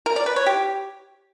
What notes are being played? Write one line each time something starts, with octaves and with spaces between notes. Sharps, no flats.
A#4
D5
B4
C#5
G4